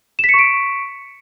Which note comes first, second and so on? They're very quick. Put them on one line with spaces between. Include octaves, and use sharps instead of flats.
E7 B6 C#7 C#6 D7